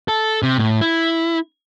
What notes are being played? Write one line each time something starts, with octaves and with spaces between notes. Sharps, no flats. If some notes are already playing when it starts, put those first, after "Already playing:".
A4
C3
A2
E4